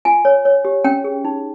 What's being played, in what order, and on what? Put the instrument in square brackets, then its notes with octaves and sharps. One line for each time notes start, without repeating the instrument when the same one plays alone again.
[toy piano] F4 G#5
C#5
C#5
G4
C#4 G5
G#4
D#4